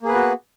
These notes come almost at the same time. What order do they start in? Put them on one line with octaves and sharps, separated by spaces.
A#3 G#4 B4 B3 F#4